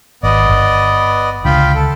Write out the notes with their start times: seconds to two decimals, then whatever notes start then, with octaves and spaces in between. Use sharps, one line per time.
0.23 G#1 B3 D5 D#5
0.49 G1
1.45 C#2 D3 F4 G5 B5
1.75 A4